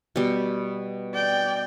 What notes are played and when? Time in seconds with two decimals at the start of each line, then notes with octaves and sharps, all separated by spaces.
0.16 B2 G3
1.14 D5 G5